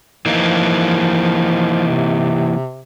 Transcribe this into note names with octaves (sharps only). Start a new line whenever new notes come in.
E3 F3 A#3 D#4
C3